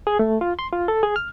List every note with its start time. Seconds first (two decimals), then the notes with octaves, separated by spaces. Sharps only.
0.07 G#4
0.19 A3
0.41 F4
0.59 C6
0.73 F4
0.88 A4
1.03 G#4
1.16 F6